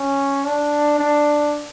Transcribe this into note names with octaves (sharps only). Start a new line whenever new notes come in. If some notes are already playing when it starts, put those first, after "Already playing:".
Already playing: C#4
D4
D4